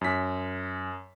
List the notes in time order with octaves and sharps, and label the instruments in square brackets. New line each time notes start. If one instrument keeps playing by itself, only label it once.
[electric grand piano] F#2 B6